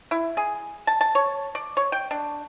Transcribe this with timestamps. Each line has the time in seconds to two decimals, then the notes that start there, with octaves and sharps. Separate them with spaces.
0.11 E4
0.37 G#4
0.87 A5
1.01 A5
1.15 C#5
1.55 D5
1.77 C#5
1.92 G5
2.11 D4